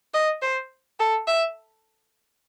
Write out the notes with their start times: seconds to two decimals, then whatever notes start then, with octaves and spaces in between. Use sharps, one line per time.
0.14 D#5
0.42 C5
1.00 A4
1.28 E5